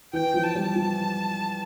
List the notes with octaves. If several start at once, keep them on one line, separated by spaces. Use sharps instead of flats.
E3 G5
F3
A5
G3
F3